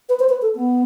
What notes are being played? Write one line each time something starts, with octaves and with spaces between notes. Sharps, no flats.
B4
C5
B4
A4
B3